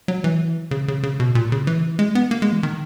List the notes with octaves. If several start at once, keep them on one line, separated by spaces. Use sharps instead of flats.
F#3
E3
C#3
C#3
C#3
B2
A#2
C#3
E3
G#3
B3
A#3
G#3
E3
D#3